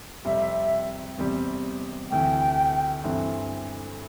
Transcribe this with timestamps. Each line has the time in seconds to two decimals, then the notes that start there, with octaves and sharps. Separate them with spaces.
0.25 F2 C3 G3 C4 G4 E5
1.18 E2 C3 G3 C4 G4
2.11 D2 C3 E3 G5
3.04 G2 E3 A3 C4